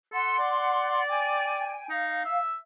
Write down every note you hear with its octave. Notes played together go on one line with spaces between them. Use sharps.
A4 F#5 C6
D5
G5 G#5
D#4 F5
E5